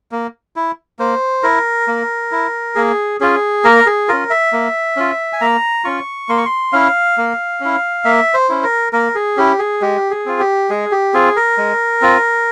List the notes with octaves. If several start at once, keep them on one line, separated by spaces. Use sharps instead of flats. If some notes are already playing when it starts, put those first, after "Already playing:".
A#3
E4
A#3 C5
E4 A#4
A#3
E4
A#3 G#4
C#4 F4 G#4
A#3 A#4
G#4
C#4 F4 A#4
E5
A#3
C#4 F4
G#5
A#3 A#5
C#4 F4 C#6
A#3 C6
C#6
C6
C#4 E4 F5
A#3
C#4 E4
A#3 E5
C5
C#4 E4
A#4
A#3 A#4
G#4
C#4 E4 G4
G#4
G#3 G4
G#4
C4 F4
G4
G#3 G#4
G4
C4 F4 G#4
A#4
G#3
C4 F4